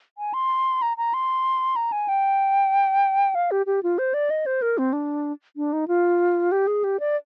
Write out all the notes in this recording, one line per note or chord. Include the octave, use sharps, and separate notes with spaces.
G#5
C6
A#5
A#5
C6
A#5
G#5
G5
F5
G4
G4
F4
C5
D5
D#5
C5
A#4
C4
D4
D4
D#4
F4
G4
G#4
G4
D5